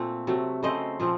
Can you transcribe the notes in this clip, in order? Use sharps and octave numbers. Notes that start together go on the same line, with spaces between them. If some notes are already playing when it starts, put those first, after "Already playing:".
Already playing: A#2 A3 C4
C3 F#3 A3
C#3 A3 C4 C5 D#5
A#2 F3 A3 C4